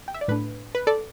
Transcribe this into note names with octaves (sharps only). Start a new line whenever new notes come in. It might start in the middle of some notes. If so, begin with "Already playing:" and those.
G5
E5
D5
A2 A3 D4 B4
B4
A4 D5